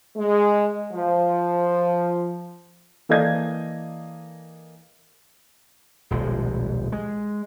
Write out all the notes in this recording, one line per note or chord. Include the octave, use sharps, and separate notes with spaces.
G#3
F3
E3 A#3 A4 D5 D#5 G#6
D#1 B1 F3 G#3
G#3